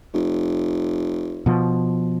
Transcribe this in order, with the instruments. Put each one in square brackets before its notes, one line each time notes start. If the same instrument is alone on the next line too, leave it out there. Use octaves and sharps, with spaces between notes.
[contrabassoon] F1
[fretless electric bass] B2 F3